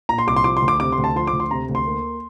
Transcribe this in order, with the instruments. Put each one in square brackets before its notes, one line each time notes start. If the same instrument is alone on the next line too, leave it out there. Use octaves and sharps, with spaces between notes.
[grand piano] A#2 A#5
C6
C2 D6
C6
F3 D6
C6
D2
D6
C3 D6
C6
D2
A5
F3 C6
D6
D2
C6
C3 A#5
D2
C6
A#3